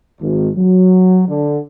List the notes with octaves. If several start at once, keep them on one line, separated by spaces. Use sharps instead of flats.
G#1
F#3
D3